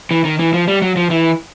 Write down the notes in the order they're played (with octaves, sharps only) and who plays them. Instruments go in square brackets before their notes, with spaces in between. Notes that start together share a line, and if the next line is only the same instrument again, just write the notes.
[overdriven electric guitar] E3
D#3
E3
F3
G3
F#3
F3
E3